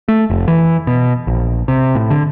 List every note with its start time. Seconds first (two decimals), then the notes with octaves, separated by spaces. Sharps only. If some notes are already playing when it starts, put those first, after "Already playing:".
0.08 A3
0.30 F1
0.48 E3
0.87 B2
1.27 A#1
1.68 C3
1.95 A2
2.10 D3